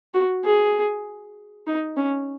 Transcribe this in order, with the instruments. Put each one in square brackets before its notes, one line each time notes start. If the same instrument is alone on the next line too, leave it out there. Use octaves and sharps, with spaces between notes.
[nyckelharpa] F#4
G#4
D#4
C#4